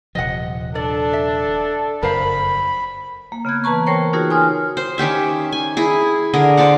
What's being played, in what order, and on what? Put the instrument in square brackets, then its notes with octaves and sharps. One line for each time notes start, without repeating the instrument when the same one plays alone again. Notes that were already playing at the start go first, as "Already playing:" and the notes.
[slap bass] D#1 C3 F3 [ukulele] D#5 F#5
[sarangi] D4 [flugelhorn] A4 [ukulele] D5
[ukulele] E5
[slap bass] F#1 F2 [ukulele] A#4 C5 F5 [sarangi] B5
[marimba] A#3
C#3 B3 F#6 G#6
E3 B4 A5 A#5 C#6
A#4 C5 C#5 G5 C#6
D#4 F4 F#4 G#4 A#4 C#5
G#5 C6 D#6 F6
[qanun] C5
D#3 C#4 G4 E5
G#5
E4 G#4
D3 G#4 A#4
C5 D5 F5 F#5